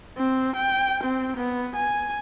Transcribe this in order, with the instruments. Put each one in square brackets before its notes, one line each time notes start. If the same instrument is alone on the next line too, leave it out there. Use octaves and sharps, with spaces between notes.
[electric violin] C4
G5
C4
B3
G#5